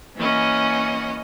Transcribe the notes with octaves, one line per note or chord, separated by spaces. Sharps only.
E3 A#3 C#4 D#5 F#5